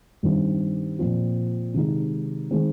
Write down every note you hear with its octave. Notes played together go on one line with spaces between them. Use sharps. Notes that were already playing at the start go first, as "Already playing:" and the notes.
G2 D#3 G3 C4
A#2 F3 C4 F4
C3 D#3 G#3 D#4
D#3 G#3 C4